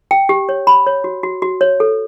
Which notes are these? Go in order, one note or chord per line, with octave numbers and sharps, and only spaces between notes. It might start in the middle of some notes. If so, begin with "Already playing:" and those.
G5
G4
C#5
B5
C#5
F#4
F#4
F#4
C#5
A4